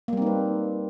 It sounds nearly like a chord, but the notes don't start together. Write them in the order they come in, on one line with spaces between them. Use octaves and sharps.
A#3 G3 C4 D#4 B4